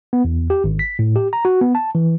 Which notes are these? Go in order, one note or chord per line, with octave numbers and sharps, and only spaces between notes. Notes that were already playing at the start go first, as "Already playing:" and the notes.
B3
E2
G4
G#1
B6
A2
G4
A#5
F#4
B3
A5
E3